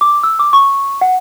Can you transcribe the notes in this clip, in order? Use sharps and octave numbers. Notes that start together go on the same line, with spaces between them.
D6
E6
D6
C#6
F#5